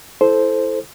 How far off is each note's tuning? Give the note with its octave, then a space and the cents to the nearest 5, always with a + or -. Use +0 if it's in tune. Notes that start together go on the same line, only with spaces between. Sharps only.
E4 +0 A4 -15 C5 +0